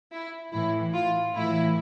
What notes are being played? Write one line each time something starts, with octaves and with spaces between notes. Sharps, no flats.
E4
A2 E3 E4
F4
A2 E3 E4